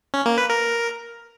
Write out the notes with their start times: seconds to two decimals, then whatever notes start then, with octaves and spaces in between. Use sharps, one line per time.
0.14 C#4
0.26 A#3
0.38 B4
0.50 A#4